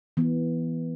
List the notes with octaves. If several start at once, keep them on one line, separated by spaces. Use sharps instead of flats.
E3 B3